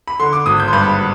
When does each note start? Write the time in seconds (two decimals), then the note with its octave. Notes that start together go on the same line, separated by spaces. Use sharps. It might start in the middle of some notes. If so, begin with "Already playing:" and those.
0.07 B5
0.20 D3 C6
0.33 D6
0.46 G#1 D#6
0.60 G6
0.68 C6
0.73 G2 B5